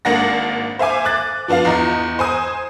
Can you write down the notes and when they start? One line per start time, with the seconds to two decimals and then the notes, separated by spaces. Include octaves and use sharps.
0.05 G#1 A#3 D4 F#5 A#6
0.79 C5 E5 F5 G#5 D6
1.05 D6 F#6 A6
1.48 F3 B3 D4 F4 F5
1.65 E2 D#5 A#5
2.19 C5 G#5 D#6